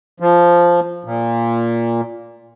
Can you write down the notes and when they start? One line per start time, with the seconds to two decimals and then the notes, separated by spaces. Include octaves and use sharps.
0.20 F3
1.05 A#2